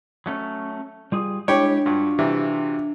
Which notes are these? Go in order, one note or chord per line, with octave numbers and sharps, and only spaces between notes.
F#3 A3 C#4
G3 F4 G#4
G#3 D4 E4 G4 C#5 G5
G2 F4 F#4
C3 E3 G3